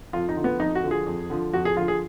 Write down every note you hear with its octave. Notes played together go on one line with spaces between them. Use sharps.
F2 F4
D#4
D3 F3
B3
F2 D#4
F#4
D3 F3
G#4
F2
D3 F3
F2 F#4
G#4
D3 F3 F4
G#4